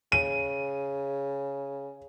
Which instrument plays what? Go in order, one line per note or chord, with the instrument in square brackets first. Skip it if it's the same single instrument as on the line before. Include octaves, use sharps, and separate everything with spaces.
[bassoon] C#3 [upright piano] D#7